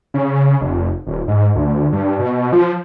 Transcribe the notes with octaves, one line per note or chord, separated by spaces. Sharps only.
C#3
F1
D#1
G#2
D2
G2
B2
F3